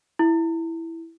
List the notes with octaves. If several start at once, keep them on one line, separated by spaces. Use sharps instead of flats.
E4